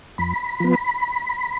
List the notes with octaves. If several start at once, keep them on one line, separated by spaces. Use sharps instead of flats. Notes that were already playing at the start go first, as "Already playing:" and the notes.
F2 B5
F3 B3